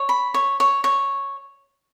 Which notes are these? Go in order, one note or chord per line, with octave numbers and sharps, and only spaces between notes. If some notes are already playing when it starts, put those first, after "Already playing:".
Already playing: C#5
B5
C#5
C#5
C#5